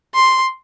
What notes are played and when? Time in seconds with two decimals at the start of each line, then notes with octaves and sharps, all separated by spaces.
0.15 C6